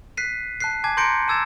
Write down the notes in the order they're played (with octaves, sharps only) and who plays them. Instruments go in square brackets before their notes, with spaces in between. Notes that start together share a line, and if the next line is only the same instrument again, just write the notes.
[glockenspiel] F#6 B6 C7 D#7
A5 F#6 C7
G#5 A5 D6 G#6
A#5 C6 G6 A#6 C#7 D7
A5 D6 E6 G#6 A6 E7